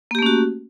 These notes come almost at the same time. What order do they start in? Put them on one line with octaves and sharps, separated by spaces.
A#3 G4 A3 C#4 F#4